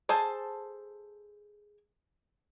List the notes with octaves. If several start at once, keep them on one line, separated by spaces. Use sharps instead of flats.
G#4 A4 C5 G#5 A5